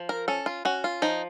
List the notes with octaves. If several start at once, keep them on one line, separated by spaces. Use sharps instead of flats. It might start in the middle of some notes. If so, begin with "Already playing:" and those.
Already playing: F3
A#4
C#4 A4
F4
C#4 F#4
F4
F3 D#4